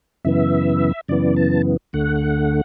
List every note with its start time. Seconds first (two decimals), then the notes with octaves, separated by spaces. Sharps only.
0.25 F#2 C#3 E3 B3 E5
1.08 F#2 C#3 E3 B3 D5
1.36 A5
1.93 D2 D3 A3 F#5